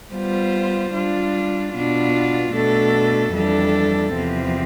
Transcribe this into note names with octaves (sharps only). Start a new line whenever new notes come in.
G3 B3 F4 C5
G3 D4 F4
B2 B3 D4 F4
B2 A3 D4 A4
F2 E3 G3 D4 A4
E2 C3 F3 C4